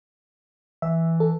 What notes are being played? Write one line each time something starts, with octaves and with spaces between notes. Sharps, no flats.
E3 E5
A4